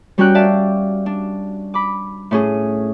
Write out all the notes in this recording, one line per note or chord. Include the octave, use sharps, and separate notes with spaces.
G3 C#4 F#4 A#4 G5 F#6
D5 E5 F5 A5
D4
B5 D6
A2 C#4 G#4